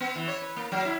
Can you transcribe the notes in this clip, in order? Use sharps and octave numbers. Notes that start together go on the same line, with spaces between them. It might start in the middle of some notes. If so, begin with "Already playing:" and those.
B3
E3
C#5
B4
A#3
F#3
E4